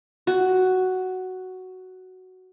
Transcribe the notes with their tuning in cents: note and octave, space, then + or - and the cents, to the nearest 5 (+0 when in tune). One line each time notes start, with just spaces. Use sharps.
F#4 +5